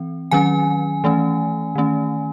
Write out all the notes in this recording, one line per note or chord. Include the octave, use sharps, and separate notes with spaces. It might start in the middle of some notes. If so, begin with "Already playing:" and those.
Already playing: E3 C4
D#3 F#3 C#4 G#5
E3 A3 C#4
D#3 A3 C#4